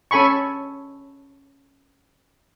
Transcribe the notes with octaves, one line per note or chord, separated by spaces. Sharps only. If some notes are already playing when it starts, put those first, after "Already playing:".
C#4 A4 G#5 B5 C#6